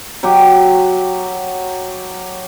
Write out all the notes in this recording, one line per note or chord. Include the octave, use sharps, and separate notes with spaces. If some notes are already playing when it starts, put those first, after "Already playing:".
F#3 G4